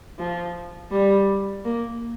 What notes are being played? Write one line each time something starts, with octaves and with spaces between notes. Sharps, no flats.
F3
G3
A#3